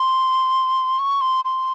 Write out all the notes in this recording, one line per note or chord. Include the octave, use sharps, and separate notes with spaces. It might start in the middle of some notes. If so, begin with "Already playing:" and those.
Already playing: C6
C#6
C6
C6